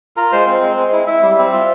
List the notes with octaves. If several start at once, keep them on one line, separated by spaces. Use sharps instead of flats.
F4 A#4 A#5
G#3 C5 C6
C4
G#3
G#3
E4
E4 E5
G3
C4
F4